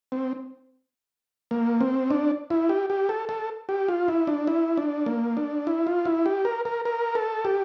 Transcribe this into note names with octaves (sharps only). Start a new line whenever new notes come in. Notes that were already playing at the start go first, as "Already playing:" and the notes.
C4
A#3
C4
D4
E4
G4
G4
A4
A4
G4
F4
E4
D4
E4
D4
A#3
D4
E4
F4
E4
G4
A#4
A#4
A#4
A4
G4